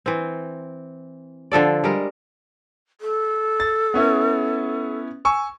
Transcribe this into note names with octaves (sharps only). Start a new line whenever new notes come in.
E3 C4
D3 F3 A4 D5
G3 G#3 A#4
A4
A6
B3 C#4 E4
G#5 C#6 E6